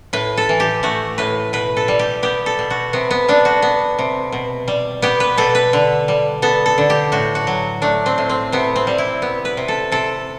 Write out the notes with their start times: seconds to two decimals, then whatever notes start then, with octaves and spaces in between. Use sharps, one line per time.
0.13 A2 B4
0.37 A4
0.49 E3
0.60 G4
0.83 A3 F#4
1.18 A2 B4
1.53 B2 B4
1.77 A4
1.88 G3
1.99 G4
2.23 B3 G4
2.46 A4
2.59 B2
2.70 F#4
2.93 C3 B3
3.11 B3
3.28 G3 D4
3.45 F#4
3.62 B3
3.99 C3
4.32 B2
4.68 G3
5.02 B3 G4
5.20 B4
5.37 B2 A4
5.55 B4
5.73 D3
6.08 G3
6.42 B3 A4
6.66 A4
6.78 D3
6.90 G4
7.12 A2 F#4
7.35 F#4
7.47 F#3
7.82 A3 D4
8.06 C4
8.18 A2
8.29 C4
8.52 C3 B3
8.76 C4
8.87 G3
8.98 E4
9.22 B3
9.45 B4
9.57 C3
9.68 A4
9.92 C3 A4